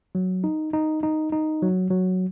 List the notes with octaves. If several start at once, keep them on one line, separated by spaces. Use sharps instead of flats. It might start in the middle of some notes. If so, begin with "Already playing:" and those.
F#3
D#4
D#4
D#4
D#4
F#3
F#3